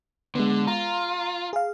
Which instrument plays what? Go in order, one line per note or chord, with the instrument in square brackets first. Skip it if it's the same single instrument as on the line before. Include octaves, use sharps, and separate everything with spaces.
[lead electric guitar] D3 [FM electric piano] G#3 B3
[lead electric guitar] F4 [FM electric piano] A#5
[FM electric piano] G#4 F5